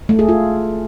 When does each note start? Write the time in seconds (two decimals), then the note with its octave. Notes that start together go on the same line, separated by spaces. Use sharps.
0.09 A3
0.19 G#4
0.29 F4